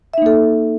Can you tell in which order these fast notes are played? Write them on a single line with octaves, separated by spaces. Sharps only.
E5 D#4 A#3 A4